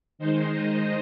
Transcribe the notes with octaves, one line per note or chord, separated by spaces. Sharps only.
D#3 G#3 D#4 C5
D#5